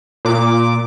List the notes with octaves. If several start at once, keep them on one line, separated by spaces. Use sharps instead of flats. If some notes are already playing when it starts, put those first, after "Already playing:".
A#2 D6